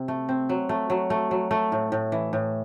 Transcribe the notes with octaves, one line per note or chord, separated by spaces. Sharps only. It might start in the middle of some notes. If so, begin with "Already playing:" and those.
Already playing: C3 C4
A3
C4
F#3
A3
F#3
A3
F#3
A3
A2
A2
E3
A2